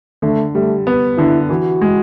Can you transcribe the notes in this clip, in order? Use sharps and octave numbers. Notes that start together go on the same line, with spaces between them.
D3 A3
G3 A3
B3
D3 E4
E3 F#4
G#3